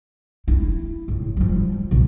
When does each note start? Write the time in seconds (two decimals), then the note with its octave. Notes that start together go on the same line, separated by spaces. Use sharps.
0.48 E4
1.08 A2
1.37 F3 G3
1.91 C2 A#2